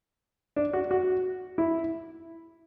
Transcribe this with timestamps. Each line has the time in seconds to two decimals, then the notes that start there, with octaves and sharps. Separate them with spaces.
0.56 D4
0.73 F#4
0.91 F#4
1.58 E4